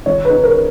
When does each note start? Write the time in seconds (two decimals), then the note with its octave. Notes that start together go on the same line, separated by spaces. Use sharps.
0.06 D#3 C#5
0.25 B4
0.30 D#4
0.43 A#4